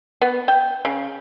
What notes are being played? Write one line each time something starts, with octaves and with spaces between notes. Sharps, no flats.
B3
G5
C#3